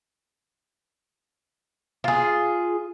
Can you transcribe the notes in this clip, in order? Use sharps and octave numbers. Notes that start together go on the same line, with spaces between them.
F4 G#4